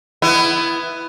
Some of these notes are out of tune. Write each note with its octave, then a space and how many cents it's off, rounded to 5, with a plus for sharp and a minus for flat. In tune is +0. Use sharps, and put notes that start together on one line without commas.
B3 +10 E4 +15